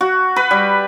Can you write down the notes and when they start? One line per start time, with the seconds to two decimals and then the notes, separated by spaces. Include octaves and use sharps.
0.01 F#4
0.36 B4
0.51 G3